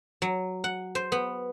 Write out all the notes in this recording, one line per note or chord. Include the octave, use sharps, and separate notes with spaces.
F#3
F#5
C5
B3